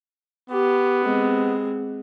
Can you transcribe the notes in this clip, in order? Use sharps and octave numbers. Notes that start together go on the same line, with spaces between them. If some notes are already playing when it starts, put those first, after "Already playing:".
B3 G4
G#3 C4